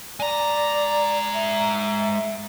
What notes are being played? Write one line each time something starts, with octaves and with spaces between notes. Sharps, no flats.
G#3 D5 A#5
E5